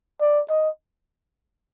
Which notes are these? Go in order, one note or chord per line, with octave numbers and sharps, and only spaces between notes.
D5
D#5